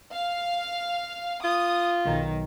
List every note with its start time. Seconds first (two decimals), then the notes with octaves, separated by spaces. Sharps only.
0.14 F5
1.44 F4 D#6
2.05 B1 D#3